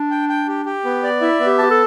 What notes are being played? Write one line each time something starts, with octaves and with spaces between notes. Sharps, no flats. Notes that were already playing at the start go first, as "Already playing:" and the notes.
Already playing: D4
G5
G5
G4
G4
B3
D5
E4 E5
B3
G4
G4 A5
A4